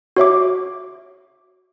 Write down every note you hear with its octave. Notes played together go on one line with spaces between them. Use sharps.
F#4 C#5 E5 D6